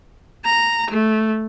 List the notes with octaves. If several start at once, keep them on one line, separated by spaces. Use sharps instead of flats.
A#5
A3